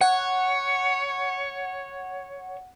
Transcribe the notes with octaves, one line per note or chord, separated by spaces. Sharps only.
C#5 F#5